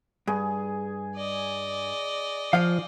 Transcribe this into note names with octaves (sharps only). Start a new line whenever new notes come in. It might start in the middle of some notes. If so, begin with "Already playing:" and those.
G2 G#4
D5 D#5
F3 F4 F5